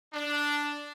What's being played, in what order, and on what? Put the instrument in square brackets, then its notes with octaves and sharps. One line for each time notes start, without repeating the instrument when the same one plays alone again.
[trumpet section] D4